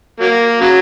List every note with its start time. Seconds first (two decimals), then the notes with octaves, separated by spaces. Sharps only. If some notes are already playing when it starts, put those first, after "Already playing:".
0.20 F#3 A#3
0.61 C#3 F#3